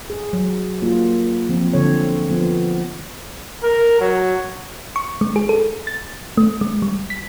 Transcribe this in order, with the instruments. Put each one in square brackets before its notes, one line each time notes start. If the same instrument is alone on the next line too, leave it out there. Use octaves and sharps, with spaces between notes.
[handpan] G#4
F#3
A#3 F4
F3 C4
D3 C4 A4 C#5
F3 B3
[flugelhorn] A#4
F#3
[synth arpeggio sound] C#6
G#3
G#4
A4
A6
A3
G#3
G3
B6